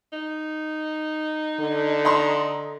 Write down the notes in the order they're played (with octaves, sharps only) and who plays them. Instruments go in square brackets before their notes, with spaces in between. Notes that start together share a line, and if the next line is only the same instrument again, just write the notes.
[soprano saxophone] D#4
[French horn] D3
[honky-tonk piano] D#5 A#5 C6